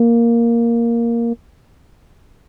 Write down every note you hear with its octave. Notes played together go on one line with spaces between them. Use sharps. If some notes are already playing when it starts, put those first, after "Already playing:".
Already playing: A#3